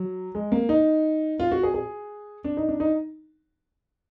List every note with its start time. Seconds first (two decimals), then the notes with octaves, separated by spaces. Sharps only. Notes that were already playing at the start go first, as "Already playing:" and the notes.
Already playing: F#3
0.35 G#3
0.52 A#3
0.69 D#4
1.40 F4
1.51 F#4
1.63 G#4
1.74 G#4
2.44 D4
2.57 D#4
2.68 D4
2.80 D#4